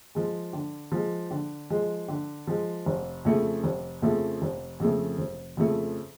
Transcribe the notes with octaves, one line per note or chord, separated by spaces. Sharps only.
F3 G#3
D3
F3 G#3
D3
F3 G#3
D3
F3 G#3
F1
F2 C#3 F3 A3
F1
F2 C#3 F3 A3
F1
F2 C#3 F3 A3
F1
F2 C#3 F3 A3